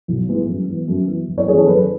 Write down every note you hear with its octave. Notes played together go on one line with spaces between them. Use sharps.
B1
A2 G#3 B3
F#2
E3 B3
F#2
E3 B3
F#1
C#5
F#2 E3 B3 G#4
A4
F#1 B4